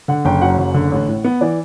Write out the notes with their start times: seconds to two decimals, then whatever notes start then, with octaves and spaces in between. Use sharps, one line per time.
0.08 D3 F#5
0.25 F#1 G5
0.42 F#2 F#5
0.58 F#1
0.74 D3
0.92 A1
1.08 A2
1.24 B3
1.41 E3 D5